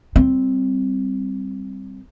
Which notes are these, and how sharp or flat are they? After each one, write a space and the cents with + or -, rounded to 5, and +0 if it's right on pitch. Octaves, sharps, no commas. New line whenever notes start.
G3 +0 C4 +0